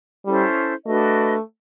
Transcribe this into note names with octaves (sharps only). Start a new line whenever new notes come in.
G3 C#4 E4 A4 C5
A3 D4 F#4 B4 D#5